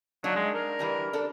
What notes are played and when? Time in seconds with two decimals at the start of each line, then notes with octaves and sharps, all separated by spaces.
0.24 F#3 A#3 D4 D#4
0.36 G#3
0.54 A#4
0.79 E3 G3 D4
1.13 D4 A4